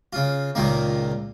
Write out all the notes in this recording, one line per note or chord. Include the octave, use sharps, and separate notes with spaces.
C#3 F4
C#2 A#2 D#3 A#3